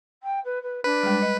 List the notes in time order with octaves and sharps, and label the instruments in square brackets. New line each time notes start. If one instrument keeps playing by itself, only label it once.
[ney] G5
B4
B4
[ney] D4 [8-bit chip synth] B4
[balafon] G3 G#3
D#5